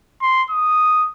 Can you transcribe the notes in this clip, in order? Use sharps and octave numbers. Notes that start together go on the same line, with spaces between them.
C6
D#6